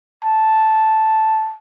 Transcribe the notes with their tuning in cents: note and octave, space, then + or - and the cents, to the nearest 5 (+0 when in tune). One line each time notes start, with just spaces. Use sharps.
A5 -5